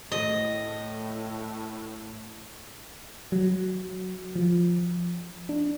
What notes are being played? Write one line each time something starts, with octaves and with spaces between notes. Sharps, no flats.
A2 D#5
F#3
F3
D4